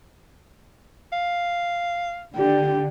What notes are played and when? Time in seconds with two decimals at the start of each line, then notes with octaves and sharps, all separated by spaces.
1.13 F5
2.36 D3 G4